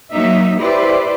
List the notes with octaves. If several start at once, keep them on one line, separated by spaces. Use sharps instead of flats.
F#3 A#3 D#4 E5
E4 G4 B4 C5 D5